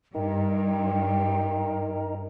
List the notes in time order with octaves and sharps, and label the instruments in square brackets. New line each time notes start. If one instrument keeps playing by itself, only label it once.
[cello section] G2 [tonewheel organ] D#4 A#4 [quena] G5